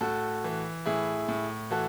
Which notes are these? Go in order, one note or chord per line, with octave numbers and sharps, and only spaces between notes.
A2 F#4 A4
E3
A2 E4 G#4
A2
E3 F#4 A4